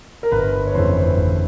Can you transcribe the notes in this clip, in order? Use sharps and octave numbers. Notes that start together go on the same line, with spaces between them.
A#4
G1 B4
C#5
F2 C#3 E3 A3 C5
G1